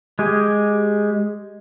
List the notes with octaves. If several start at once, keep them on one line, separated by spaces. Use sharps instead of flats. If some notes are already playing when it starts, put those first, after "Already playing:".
G#3 G4 G#5